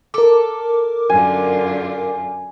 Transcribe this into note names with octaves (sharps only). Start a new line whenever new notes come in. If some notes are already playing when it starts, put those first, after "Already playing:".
A4 A#4 D6
F#2 D3 F4 G#5